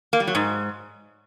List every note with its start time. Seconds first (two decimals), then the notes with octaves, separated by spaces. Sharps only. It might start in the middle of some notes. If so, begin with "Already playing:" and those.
0.13 A#3
0.20 G3
0.27 F#3
0.35 G#2